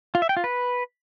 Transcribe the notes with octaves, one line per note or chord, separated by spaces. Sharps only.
F4
E5
G5
F4
B4